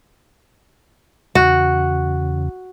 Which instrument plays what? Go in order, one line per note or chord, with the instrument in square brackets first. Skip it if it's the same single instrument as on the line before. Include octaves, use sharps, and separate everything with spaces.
[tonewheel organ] E2 C#3 [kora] F#4